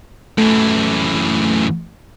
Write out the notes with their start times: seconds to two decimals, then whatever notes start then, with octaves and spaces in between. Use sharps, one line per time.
0.38 F#2 E3 A3